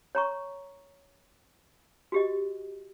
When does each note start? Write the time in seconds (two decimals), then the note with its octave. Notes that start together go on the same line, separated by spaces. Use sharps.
0.15 C#5 A#5 C#6
2.12 F#4 G4 D#5